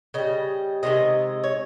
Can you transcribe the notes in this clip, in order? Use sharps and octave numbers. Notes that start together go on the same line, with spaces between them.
C#3 G3 D#5
C3 D#3 G#3 D#5
C#5